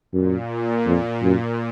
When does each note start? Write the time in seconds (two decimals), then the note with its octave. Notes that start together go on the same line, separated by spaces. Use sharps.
0.13 F#2 A#2
0.86 F2
1.23 F#2